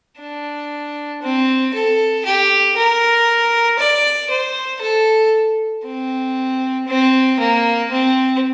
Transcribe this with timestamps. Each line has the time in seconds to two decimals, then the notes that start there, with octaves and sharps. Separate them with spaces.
0.19 D4
1.23 C4
1.74 A4
2.26 G4
2.77 A#4
3.79 D5
4.30 C5
4.82 A4
5.85 C4
6.87 C4
7.40 A#3
7.91 C4